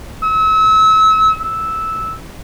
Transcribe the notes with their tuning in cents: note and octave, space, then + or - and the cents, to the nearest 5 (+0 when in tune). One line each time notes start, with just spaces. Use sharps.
E6 -35
E6 -10